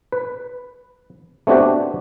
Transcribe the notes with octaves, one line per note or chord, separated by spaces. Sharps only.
B4
A3 B3 C4 D4 F#4 G4